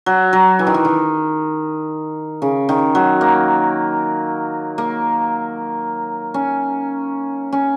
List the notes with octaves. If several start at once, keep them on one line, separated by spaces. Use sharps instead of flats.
F#3
F#3
E3
D#3
E3
D#3
C#3
D#3
F#3
A#3
A#3
C#4
C#4